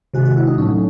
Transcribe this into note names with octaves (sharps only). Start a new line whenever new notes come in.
C3 D#3 G#3 F#4
F#4
E4
D#4
A2 F#3 A3 C#4